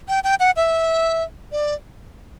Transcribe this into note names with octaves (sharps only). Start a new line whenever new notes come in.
G5
G5
F#5
E5
D5